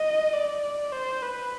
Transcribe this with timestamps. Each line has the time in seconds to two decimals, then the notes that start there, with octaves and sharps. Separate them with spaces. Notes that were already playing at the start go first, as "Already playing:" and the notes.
Already playing: D#5
0.33 D5
0.93 C5
1.22 B4